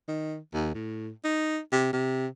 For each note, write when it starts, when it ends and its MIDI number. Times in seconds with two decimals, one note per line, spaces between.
0.08 0.37 51
0.54 0.70 39
0.74 1.10 45
1.24 1.59 63
1.72 1.92 48
1.93 2.27 48